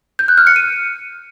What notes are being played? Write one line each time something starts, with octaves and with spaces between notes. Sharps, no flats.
G6
F#6
F6
C#7
D#7